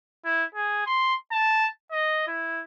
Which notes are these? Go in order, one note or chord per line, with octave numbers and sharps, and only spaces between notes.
E4
G#4
C6
A5
D#5
E4